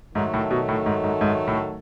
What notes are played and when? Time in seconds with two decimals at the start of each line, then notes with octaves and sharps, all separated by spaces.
0.15 G#2 D#3 F#3 A3
0.34 A2
0.51 B2
0.69 A2
0.86 G#2
1.04 G#2
1.21 G#2
1.48 A2